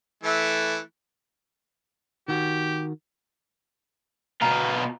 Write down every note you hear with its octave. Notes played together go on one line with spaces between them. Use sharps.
E3 A3
D#3 F#4 G4
B2 F4 A#5